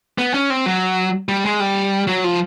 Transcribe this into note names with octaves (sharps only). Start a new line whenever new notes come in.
B3
C#4
C4
F#3
G3
G#3
G3
F#3
F3